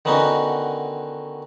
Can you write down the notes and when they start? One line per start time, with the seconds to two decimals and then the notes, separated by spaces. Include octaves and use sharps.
0.05 D3 D#3 B3 C#4 D#4 F#4